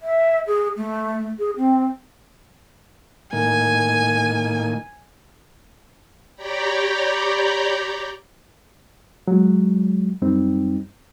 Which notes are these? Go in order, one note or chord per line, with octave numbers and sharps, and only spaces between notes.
E5
G#4
A3
G#4
C4
A2 D#3 A#3 G#5
G4 C#5 D5 G5 A#5 B5
F#3 G#3
F#2 G3 C4 D#4